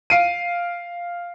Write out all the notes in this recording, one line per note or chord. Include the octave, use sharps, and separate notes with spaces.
F5 C7 D7 D#7